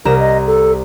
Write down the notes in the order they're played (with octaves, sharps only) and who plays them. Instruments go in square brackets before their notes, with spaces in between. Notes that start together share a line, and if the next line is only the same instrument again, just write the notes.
[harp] C2 A#5 E7 [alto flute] A#4
[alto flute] D#5
A4